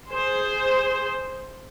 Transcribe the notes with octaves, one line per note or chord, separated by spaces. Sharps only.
G#4 C5